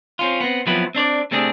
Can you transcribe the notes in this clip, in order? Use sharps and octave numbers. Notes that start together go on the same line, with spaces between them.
C4 C#4 F4
B3 C4
F3 F#3 B3 C4 E4 B4
C4 D4 C#5 D5
C3 A3 C4 D4 G#4